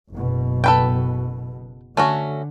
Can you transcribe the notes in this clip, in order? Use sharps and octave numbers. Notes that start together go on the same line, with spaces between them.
F#1 B2
A4 B4 G5
D3 A3 C#4 F#4